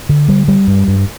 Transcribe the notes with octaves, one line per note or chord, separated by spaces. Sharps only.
D3
G3
G3
G2
G2